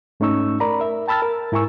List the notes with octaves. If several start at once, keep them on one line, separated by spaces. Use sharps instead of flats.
G#2 A3 C#4 D#4 C#6 E6
A#4 D5 A#5 B5
A#4 E5
G5 A5 B5 E6 F6 A6
A#4
G#2 E4 A#4 G#5 C#6 E6